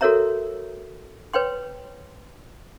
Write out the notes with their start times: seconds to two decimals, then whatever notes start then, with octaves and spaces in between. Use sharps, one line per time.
0.01 F#4 A4 A#4 C#5 E5 A#5
1.34 B4 C#5 G5 C6